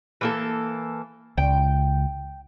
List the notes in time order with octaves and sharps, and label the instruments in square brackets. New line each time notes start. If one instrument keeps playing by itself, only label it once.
[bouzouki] E3 A#3 A4
[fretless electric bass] C#2 [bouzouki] G5